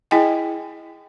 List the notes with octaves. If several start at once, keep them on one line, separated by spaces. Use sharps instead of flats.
E4 G#4 D#5 G5 G#5